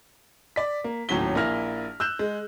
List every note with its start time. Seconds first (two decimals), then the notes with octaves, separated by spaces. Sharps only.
0.56 D5 B6
0.84 A#3
1.09 D#1 A2 F#3 C#4 B6 G7
1.35 A#1 A#3 E4 G#5 F6 A#6
2.00 E6 F#6 G6 E7
2.19 G#3